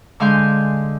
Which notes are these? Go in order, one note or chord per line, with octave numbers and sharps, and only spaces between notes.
D3 G#3 F5 G#5 C6 G6